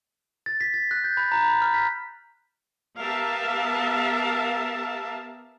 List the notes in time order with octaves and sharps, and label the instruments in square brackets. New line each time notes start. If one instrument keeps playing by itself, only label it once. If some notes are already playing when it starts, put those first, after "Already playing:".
[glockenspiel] A6
B6
A6
F#6
G6
B5
A#5
B5
F6
B6
[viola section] B3 G4 A#4 E5 F5 A5